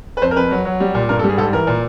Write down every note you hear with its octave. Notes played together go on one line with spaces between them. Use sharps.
B4
F2 C5
A#4
F2 B4
F#3
F#3
G3
A#2
G2 A#4
A4
G3
G#4
G#2 A4
E3 A#4
A#2